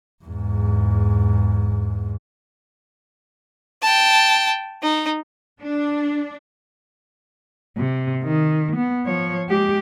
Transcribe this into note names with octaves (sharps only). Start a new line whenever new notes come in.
E2 G#2
G5 A5
D#4
D4
C3
D#3
B3
F3 C#5
G#3 G4